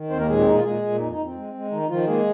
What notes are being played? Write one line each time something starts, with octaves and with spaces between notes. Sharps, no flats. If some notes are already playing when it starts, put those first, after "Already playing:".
Already playing: D#3
D#2 C4 C5
A#3 A#4
A#2 G#3 G#4
C4
A#2 D#4
F4
A#2 G#3 G#4
A#2
F2 D#4
D#4
F2
C4
G#3
G#3
D#3 D#4
D#3 F3 F4
G#3 A#3 G#4